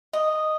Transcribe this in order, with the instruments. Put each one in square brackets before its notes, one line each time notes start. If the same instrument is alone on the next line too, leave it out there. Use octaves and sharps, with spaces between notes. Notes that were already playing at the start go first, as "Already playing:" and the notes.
[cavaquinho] D#5